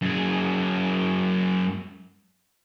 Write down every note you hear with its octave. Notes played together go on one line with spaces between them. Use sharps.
F#2 G#4